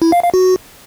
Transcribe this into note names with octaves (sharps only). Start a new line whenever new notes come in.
E4
F5
F5
F#4